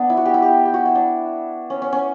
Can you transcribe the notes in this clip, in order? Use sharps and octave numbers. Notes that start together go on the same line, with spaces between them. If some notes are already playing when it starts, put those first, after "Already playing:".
Already playing: B3 D4
E4
F#4
G4
E4
G4
G4
F#4
E4
D4
C#4
C#4
C#4